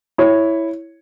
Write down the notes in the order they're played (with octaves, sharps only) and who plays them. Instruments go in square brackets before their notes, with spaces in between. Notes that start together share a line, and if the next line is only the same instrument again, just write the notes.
[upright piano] E4 C#5